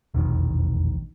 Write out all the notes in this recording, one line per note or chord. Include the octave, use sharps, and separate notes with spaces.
E1 A#1 F2 D#3